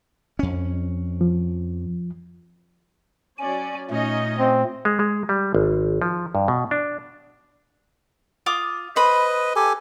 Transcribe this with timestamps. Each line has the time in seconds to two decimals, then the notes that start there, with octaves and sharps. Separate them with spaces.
0.39 F2 C#4
1.21 F3
3.39 F#3 C#4 D5 G#5
3.90 A#2 A3 C#4 D#4 D#5
4.39 C4
4.85 G#3
4.99 G#3
5.29 G3
5.55 G#1
6.02 F3
6.35 G2
6.48 B2
6.71 D4
8.46 F4 D6 D#6
8.96 B4 C5 D#5 B5
9.56 G4 A4 G#5